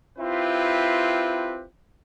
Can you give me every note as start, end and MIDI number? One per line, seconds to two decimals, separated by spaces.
0.18 1.63 60
0.18 1.63 64
0.18 1.63 65
0.18 1.63 67
0.18 1.63 71